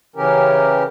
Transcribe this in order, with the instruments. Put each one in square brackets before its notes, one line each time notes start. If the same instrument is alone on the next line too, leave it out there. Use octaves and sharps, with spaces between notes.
[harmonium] C#3 E3 C#4 G4 A#4